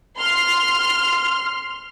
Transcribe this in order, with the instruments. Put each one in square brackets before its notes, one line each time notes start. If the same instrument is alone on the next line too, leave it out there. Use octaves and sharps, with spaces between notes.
[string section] C6 F6